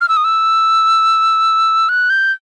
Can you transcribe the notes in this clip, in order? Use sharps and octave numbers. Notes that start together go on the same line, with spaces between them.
F6
E6
D#6
E6
F#6
G6